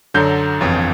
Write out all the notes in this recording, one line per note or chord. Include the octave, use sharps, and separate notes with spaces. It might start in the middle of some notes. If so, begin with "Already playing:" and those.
F#2 D3 F#3 G6
G1 F2 C#3 E3